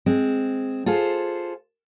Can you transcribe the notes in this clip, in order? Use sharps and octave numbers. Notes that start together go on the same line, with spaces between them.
G#3 C4
F4 G#4 A4 C5